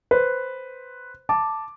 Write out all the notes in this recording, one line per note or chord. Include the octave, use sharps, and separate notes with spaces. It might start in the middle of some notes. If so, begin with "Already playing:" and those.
B4 C5
A5 D6